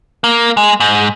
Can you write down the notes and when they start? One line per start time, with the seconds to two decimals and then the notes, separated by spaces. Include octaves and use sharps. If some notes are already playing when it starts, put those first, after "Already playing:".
0.24 A#3
0.57 G#3
0.80 G#2